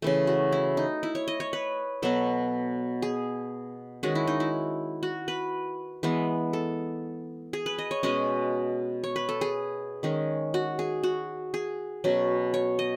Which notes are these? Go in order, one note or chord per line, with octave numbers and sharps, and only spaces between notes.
C#3 E3 A3
F#4
E4
D#4
E4
C#5
D#5
C#5
B4
B2 F#3 B3 A4
G#4
D#3 G#3 C#4 F#4
E4
D#4
E4
F#4
B4
E3 G#3 B3
A4
G#4
B4
D#5
C#5
B2 G#3 C#4 D#5
C#5
B4
A4
G#4
D#3 G#3 C#4
F#4
G#4
F#4
G#4
B2 F#3 C#4
C#5
D#5